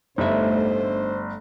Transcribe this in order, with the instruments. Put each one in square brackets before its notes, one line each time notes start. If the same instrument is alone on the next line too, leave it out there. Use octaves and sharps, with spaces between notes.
[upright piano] G1 [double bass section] D3 A3 [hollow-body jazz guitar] D#4 E5 [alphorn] C5